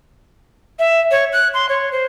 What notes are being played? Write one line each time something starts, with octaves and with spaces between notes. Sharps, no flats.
E5
C#5
F#6
C6
C#5
C5